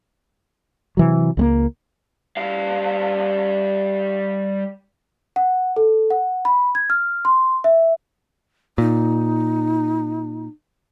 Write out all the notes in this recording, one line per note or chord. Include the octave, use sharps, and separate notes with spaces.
C3 E3 F#3
C#2 G#3 A#3
G3 F5
F#5
A4
F#5
B5
G#6
F6
C6
E5
A#2 D#4